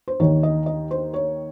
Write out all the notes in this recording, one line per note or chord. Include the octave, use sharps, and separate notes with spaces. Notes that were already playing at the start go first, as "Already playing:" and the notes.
C5
D#2 D#3 C#5
D#5
D#5
C5
C#5